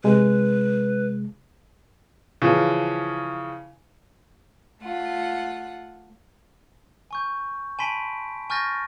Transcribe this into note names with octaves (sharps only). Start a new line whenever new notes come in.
C3 G#3 B4
C#3 E3 F3
A3 F4 F#5
G#5 C#6 G6
G#5 A5 B5 C6 B6 D7
G#5 C#6 F6 G6 A6 A#6